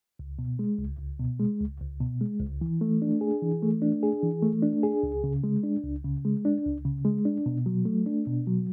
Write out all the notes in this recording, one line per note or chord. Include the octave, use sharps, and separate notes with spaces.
C#2
B2
G#3
C#2
C#2
B2
G#3
C#2
C#2
B2
G#3
C#2
E3
A3
D4
G#4
E3
A3
D4
G#4
E3
A3
D4
G#4
C#2
C#3
G#3
D4
C#2
C#3
G#3
D4
C#2
C#3
G#3
D4
B2
F#3
A3
D4
B2
F#3